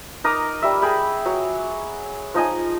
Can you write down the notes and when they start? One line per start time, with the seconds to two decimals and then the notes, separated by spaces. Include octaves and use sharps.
0.24 D#4 A#4 D6 D#6
0.62 G3 E5
0.82 G#4 G5 B5
1.26 F#3
2.34 F3 D#4 D#5 G#5